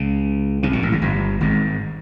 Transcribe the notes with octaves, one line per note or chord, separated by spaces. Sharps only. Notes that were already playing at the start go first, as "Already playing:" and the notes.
Already playing: C#2 C#3
C2 C3
A#1 A#2
A1 A2
G#1 G#2
G1 G2
G#1 G#2